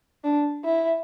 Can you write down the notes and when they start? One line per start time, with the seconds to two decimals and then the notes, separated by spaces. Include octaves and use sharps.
0.24 D4
0.64 E4